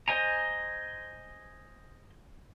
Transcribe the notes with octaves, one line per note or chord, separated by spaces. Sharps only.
C5 D#5 G#5 A#5